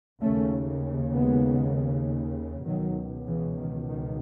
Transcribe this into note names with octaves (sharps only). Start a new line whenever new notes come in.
D#2 C#3 A3 C#4
G#3 B3
C#2 B2 D#3 F#3
C#3 E3
D#3
D#3